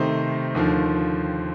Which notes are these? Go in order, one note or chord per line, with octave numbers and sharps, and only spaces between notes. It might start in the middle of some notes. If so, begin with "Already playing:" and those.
Already playing: C3 D#3 A3 D#4 C5
D#2 D3 F3